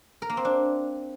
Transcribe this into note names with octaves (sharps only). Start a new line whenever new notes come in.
A#4
A#3
C4
D4